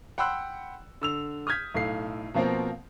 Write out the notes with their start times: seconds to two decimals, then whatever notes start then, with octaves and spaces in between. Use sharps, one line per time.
0.18 F#5 G5 B5 C6 E6 F#6
1.01 D3 E6 F7
1.47 D#6 F6 G6 G#6 B6
1.74 B1 A2 A4 F5 C7
2.34 B2 F3 A#3 C4 A#4